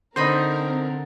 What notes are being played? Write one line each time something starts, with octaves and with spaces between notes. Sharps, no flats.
D3 C4 D#4 A#4 C5 D#5 B5